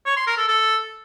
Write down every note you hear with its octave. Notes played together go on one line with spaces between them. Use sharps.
C#5
C6
A#4
A4
A4